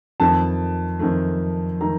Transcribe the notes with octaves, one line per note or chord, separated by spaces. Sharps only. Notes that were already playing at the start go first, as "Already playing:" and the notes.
F2 D#3 A3 A5
F2 D#3 A3
D#3 A3 A#5